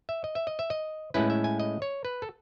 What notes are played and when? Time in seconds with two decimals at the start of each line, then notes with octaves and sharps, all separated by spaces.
0.09 E5
0.24 D#5
0.35 E5
0.47 D#5
0.59 E5
0.70 D#5
1.14 A2 G#3 C#4 E4 B4
1.30 E5
1.44 G#5
1.60 D#5
1.82 C#5
2.05 B4
2.22 A4